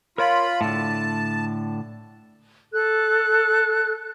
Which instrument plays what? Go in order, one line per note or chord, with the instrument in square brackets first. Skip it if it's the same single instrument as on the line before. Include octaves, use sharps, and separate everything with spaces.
[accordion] F4 B5 [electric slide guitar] A#4 C#5
[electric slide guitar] A2 D3 [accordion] A5
[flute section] A4 F#6